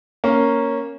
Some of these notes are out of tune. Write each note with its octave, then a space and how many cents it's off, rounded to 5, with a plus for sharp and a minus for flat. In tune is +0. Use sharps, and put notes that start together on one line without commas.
A#3 +0 C#4 +0